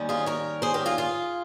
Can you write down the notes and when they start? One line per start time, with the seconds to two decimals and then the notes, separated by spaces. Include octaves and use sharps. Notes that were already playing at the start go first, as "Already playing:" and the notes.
Already playing: D#2 D#3 G3 C#4
0.09 F4 G#4
0.26 A#4 C#5
0.62 G#4 C5
0.74 G4 A#4
0.86 F4 G#4
0.98 F4 G#4